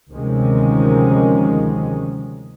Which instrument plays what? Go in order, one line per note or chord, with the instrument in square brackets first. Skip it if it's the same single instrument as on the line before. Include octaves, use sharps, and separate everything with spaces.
[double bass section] D2 C3 D#3 F3 G#3 C#4